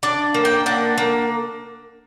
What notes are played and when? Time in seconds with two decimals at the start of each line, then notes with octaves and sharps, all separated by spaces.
0.03 D4 D5
0.34 A#3
0.45 G5
0.66 D4 F#5
0.98 A#3